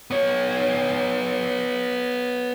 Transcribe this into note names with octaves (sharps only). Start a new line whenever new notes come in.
B3 C#5